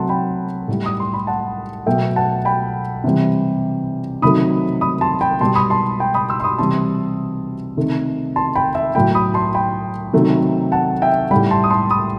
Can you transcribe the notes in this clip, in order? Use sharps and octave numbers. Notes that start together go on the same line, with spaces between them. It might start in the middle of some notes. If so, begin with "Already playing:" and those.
Already playing: C3 F#3 A3 F#5 A5 C6
G5 B5
A2 G3
D#6
C6
B5
F#5 A5
B2 F#3 A3 E5 G5
F#5 A5
G5 B5
C3 E3 G3
C3 D#3 F#3 A3 B5 D#6
B5 D#6
A5 C6
G5 B5
B2 G3 A5 C6
B5 D#6
A5 C6
G5 B5
B5 D#6
C6 E6
C6
B5 D#6
C3 E3 G3 A5 C6
C3 D#3 A3
A5 C6
G5 B5
E5 G5
A2 F#3 A3 G5 B5
B5 D#6
A5 C6
G5 B5
C3 D#3 F#3 A3
F#5 A5
E5 G5
A2 G3 G5 B5
A5 C6
D#6
A5 C6
B5 D#6